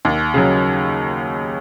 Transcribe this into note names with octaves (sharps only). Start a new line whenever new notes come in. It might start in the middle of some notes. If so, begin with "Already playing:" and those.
D#2
C#3 F#3